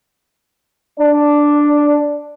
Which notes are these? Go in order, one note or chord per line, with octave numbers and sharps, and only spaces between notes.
D4